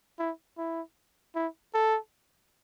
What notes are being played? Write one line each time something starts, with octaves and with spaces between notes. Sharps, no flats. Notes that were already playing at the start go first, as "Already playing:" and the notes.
E4
E4
E4
A4